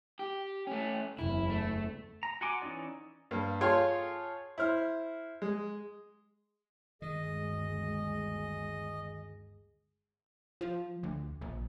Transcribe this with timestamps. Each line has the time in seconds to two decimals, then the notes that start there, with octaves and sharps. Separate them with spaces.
0.19 G4
0.67 A3 C#4
1.19 F#1 E2 E4
1.50 A3
2.23 A#5
2.41 F#4 F#5 G#5 C6 D6
2.62 E3 C#4 D#4 D5
3.31 G2 A#3
3.61 F4 G#4 A4 C#5 G5 C6
4.58 E4 C5 F6
5.42 G#3
7.02 G1 D2 D#3 G#3 G#4 D#5
10.61 F3
11.03 D2
11.41 A#1